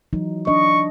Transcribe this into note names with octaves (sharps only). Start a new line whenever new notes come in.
E3 F#3 D#4
D4 D#5 C#6